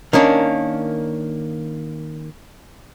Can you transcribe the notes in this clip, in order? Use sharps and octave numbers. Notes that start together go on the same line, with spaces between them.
D#3 A#3 C#4 D4